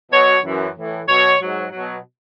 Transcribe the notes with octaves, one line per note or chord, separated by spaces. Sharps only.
B2 F#3 C#5
F#2 E3
A2 E3
B2 F#3 C#5
G#2 F#3
B2 F#3